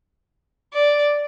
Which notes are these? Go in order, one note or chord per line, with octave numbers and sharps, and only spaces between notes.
D5